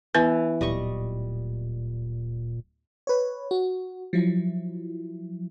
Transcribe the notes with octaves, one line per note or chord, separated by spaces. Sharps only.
E3 B3 B4
D1 A#2 G3 D#5 C#6
B4 C#5
F#4
F3 F#3 E4